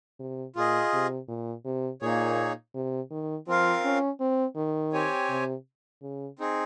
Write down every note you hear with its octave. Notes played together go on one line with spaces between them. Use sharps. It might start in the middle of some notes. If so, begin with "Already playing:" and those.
C3
A#2 F4 G#4 D#5
C3
A#2
C3
A#2 A#3 D#4 G#4 C#5
C3
D#3
F3 C4 F4 A#4 F5
C#4
C4
D#3
C4 G4 C#5 G#5
C3
C#3
C4 D#4 G#4